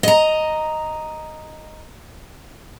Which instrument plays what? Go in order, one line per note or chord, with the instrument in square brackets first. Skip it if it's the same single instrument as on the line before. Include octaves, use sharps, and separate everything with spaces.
[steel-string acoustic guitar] D#5 A#5